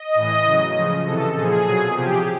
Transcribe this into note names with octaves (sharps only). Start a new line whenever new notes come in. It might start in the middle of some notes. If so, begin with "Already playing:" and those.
Already playing: D#5
A2 E3
C#3 F#3
C#3 F3
C3 E3 A4
A#2 F3 G#4
B2 F#3
C3 F3 G4